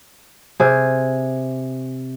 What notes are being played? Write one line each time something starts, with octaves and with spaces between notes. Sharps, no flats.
C3 G#4